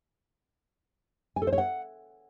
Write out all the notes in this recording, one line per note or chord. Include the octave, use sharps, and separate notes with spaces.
G#5
A4
C5
C#5
F#5